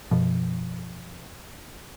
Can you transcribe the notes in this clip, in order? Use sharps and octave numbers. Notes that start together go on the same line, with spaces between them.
F#2 B2 F3